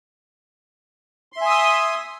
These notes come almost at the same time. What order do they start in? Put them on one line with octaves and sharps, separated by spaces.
C6 E5 G#5 D#6 E6